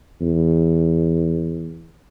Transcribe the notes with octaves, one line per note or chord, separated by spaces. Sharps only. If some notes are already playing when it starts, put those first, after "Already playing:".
E2